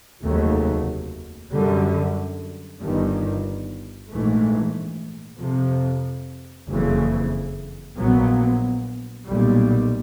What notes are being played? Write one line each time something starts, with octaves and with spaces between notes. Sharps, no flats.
F1 D#2 C#3 F#3 A3
F#2 D3 G3
G1 G2 D#3
A#1 G#2 E3 A3
F2 C3 F3
F#1 F2 C#3 E3
A#1 A#2 F#3 B3
B1 A#2 G3